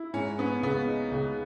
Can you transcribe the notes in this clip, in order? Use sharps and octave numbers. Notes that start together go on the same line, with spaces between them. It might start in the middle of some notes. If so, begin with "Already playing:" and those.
Already playing: E4
G#2 C#4
B3 C#4
C#2 B3
D#4
C#2